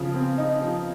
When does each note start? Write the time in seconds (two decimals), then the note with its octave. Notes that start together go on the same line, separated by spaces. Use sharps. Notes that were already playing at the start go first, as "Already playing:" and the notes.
Already playing: C#3 F3
0.14 C4
0.38 D#4
0.61 F3